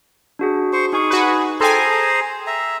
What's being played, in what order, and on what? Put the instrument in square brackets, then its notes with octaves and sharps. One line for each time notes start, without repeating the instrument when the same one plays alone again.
[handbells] D4 F#4 G#4
[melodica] C5 C#6
[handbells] D#4 G#5 C#6 [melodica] G#4
[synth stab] F#4 B4
[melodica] G#4 C5 A#5 [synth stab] A4 G#5 [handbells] G5 C6
[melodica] E5 A#5